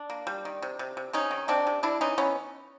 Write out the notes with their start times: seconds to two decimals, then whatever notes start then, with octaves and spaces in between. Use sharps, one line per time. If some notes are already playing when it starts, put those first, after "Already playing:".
Already playing: D4
0.10 A#3
0.27 G3
0.45 D#3
0.62 C3
0.79 C3
0.97 C3
1.13 C3 C#4 D#4
1.31 D#3
1.48 C3 C4 D4
1.67 C3
1.83 G3 D4 E4
2.01 E3 C#4 D#4
2.18 E3 B3 C#4